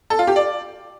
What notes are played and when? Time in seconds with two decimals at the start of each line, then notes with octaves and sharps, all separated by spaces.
0.10 A4
0.19 F4
0.27 G4
0.36 D5